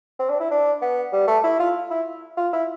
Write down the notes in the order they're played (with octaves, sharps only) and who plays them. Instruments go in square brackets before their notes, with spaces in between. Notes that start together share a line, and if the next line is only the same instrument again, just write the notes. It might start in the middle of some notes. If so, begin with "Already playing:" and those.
[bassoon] C4
D4
E4
D4
B3
G3
A3
E4
F4
E4
F4
E4